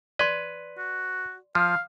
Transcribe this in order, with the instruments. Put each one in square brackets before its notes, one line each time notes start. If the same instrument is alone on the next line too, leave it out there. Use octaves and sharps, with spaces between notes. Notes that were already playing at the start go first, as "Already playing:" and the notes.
[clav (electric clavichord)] B4 [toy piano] D5 C6
[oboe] F#4
[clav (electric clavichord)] F3 [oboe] F5